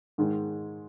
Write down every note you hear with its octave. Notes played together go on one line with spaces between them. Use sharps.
G#2 D#3 G#3